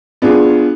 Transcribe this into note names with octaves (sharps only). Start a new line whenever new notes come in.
B3 D4 F4 G#4